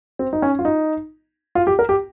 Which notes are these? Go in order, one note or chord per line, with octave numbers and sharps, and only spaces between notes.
C4
D#4
C#4
F4
D#4
F4
G4
A#4
G4